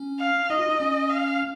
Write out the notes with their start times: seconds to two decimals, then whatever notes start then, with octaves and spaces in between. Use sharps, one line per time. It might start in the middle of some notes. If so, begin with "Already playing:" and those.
Already playing: C#4
0.20 F5
0.50 D#4 D#5
0.59 F4
0.69 D#4
0.80 C#4
1.10 F5